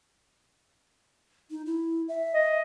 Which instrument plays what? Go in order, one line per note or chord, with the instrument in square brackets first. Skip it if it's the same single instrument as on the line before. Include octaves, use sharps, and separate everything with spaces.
[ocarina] D#4
E4
E5
[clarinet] D#5